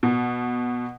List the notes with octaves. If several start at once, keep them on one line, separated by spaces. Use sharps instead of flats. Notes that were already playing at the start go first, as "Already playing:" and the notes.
B2